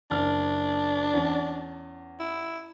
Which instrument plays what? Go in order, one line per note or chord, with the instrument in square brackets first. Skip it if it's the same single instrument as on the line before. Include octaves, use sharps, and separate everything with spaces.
[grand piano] F#1 F6 [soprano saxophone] D4
[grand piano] E2 C#4
[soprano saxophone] E4